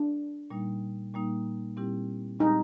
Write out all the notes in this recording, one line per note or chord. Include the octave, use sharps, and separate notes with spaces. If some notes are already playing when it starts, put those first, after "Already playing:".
Already playing: D4
A#2 G3 A#3 D#4
A#2 G3 A#3 D#4
A#2 G3 C4 E4 G4
A#2 G3 C4 D#4 E4 G4